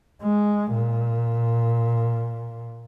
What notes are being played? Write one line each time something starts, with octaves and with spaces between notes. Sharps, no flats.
G#3
A#2